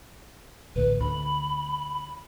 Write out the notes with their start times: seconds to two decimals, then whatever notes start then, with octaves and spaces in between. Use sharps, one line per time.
0.76 A1 D2 A2 B4
1.01 D2 B5